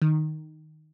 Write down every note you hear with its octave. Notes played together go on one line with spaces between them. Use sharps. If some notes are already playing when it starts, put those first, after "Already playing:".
D#3